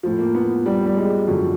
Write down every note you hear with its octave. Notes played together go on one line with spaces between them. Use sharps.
A2 F3
A#3
B3
G3
G3
G#3
F#2 D3 F3